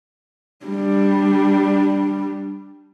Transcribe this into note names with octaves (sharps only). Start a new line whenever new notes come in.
G3 D4